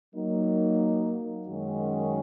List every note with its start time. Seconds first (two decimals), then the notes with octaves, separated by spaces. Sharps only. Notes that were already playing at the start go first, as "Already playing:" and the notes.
0.15 F#3 A#3 D#4
1.47 F#2 D#3 G#3 C#4 F#4